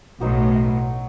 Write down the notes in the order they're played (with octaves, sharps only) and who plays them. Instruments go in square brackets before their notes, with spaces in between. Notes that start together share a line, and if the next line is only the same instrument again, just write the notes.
[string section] B1 A2 [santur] F#3 D#4 F#4